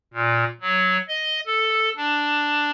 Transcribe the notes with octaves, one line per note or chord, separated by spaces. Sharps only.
A#2
F#3
D#5
A4
D4